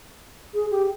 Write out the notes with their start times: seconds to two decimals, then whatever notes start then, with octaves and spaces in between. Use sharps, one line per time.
0.54 G#4
0.71 G4